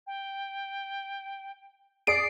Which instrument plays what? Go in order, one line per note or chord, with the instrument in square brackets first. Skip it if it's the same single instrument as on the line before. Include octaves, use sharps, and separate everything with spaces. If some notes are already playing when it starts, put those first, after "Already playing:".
[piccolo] G5
[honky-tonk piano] G#4 D5 D#6 [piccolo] C7 [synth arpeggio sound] D7